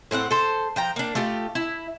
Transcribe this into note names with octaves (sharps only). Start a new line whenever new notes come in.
A2 C4 F#4 F#5
A4 C5
F3 G5 A#5
A#3 D4
A3 F4 G4
E4